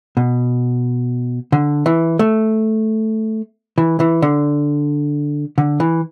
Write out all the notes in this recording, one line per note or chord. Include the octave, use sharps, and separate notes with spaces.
B2
D3
E3
A3
E3
E3
D3
D3
E3